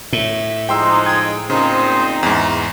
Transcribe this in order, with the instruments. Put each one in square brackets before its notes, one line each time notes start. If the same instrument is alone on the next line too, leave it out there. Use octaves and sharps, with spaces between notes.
[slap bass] A2 [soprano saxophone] E5
[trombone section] F3 G#3 D#4 [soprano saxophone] C5 [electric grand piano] G5 C6 E6
[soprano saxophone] G5 [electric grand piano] D#6 G#6
[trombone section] A#2 C4 D#4 [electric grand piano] C#3 [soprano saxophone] C5
[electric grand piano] E2 G#2 [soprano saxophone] E4